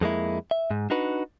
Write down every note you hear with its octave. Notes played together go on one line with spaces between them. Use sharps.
F2 G#3 A#3 E4
E5
G#2
D4 D#4 F#4 B4